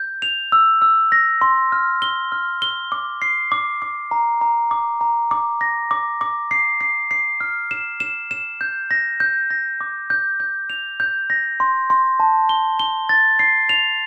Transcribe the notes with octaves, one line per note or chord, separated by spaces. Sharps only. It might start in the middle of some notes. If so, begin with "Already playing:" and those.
Already playing: G6
F7
E6
E6
A#6
C6
F6
G7
F6
G7
D6
C7
D6
D6
A#5
A#5
D6
A#5
D6
A#6
D6
D6
C7
C7
C7
F6
E7
E7
E7
G6
A#6
G6
A#6
D6
G6
G6
F7
G6
A#6
C6
C6
A5
G7
G7
A6
C7
F7